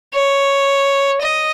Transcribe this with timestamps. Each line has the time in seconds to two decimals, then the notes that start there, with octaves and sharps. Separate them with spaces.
0.13 C#5
1.22 D#5